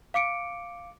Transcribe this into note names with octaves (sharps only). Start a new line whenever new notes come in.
F5 D6 C#7 D7